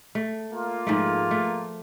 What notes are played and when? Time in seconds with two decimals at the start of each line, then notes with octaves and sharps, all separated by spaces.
0.15 A3
0.53 A#3 F4
0.87 G#2 F3 A3
1.31 A3